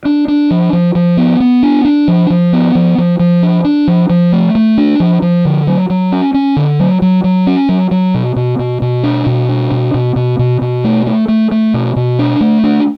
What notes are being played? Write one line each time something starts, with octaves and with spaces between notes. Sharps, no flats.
D4
D4
F3
F3
F3
B3
B3
D4
D4
F3
F3
B3
F3
F3
F3
D4
D4
F3
F3
A3
A3
D4
F3
F3
D3
F#3
F#3
C#4
C#4
D3
F#3
F#3
F#3
C#4
F#3
F#3
B2
B2
B2
B2
D4
B2
D4
B2
B2
B2
B2
B2
A3
A3
A3
A3
B2
B2
D4
A3
D4